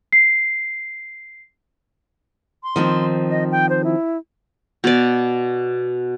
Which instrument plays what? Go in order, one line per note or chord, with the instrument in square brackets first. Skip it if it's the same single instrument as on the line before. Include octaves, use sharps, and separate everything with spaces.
[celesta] C7
[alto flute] C6
[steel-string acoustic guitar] D#3 F3 C4
[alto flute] D#5
G5
C5
E4
[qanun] B2 D5